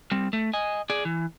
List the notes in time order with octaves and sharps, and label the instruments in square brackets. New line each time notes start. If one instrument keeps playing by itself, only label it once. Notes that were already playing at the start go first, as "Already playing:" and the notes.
[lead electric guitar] G3 C4
A3
D#5 G#5
G#4 D5
E3